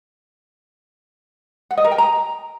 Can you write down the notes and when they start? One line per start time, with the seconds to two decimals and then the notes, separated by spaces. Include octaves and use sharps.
1.71 F#5
1.78 D#5
1.84 A#4
1.91 G5
1.98 A#5